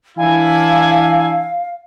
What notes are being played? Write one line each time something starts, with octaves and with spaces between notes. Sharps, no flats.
E3 D4 E4 F5 G#5